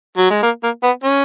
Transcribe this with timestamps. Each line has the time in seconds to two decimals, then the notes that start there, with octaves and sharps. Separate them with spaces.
0.18 F#3
0.30 G#3
0.43 A#3
0.63 A#3
0.83 B3
1.04 C#4